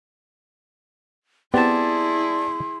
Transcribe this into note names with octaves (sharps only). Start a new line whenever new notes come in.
B3 C4 E4 G4 G#4 D5 A5 C6